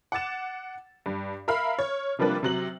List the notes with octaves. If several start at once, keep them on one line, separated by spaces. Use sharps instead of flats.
F#5 D6 A6 E7
G2
A#4 E5 F5 B5 F6
C#5
C3 F3 G3 A#3 D4 B4
C3 F#3 F#7